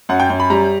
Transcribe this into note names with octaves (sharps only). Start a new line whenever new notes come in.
F#2 F#5
G5
F#2
B5
G3 A#5